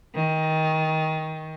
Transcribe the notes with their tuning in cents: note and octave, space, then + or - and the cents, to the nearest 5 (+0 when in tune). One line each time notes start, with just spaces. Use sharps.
D#3 +20